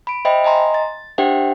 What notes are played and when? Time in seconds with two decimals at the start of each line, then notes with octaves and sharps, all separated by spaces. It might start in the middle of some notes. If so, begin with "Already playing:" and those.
0.07 B5 D7
0.25 C5 D#5 E5 G5 B5
0.44 D#5 G#5 A#5 C6
0.74 A6
1.18 D4 G4 C5 E5 F#5 G5